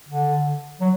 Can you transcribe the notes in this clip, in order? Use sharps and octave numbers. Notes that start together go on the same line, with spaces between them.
D3
F#3